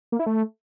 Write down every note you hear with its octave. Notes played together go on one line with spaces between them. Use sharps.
A#3
E4
A3